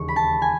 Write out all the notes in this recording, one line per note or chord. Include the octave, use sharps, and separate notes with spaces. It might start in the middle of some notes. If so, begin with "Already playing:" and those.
Already playing: E1 D#2 C#3 C#6
B5
A5
G#5